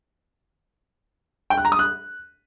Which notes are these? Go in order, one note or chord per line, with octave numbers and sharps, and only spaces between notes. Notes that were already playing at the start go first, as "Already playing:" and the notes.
G5
F#6
A#5
D#6
F#6